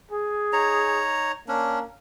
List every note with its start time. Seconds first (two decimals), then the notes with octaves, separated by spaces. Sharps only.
0.11 G#4
0.53 D#4 C#5 A#5
1.48 A#3 C#4 D4